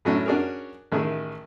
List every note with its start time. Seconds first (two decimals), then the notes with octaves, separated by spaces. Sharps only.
0.05 A2 F#3 C#4 D4 E4
0.26 C#4 D4 F#4 G#4 A#4
0.92 A1 D#3 E4 G#4